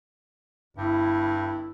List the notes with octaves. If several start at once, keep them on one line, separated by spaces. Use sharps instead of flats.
G1 G2 E4